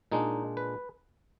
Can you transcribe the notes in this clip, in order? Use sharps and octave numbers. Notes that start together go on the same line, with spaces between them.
A#2 G#3 D4 D#4
B4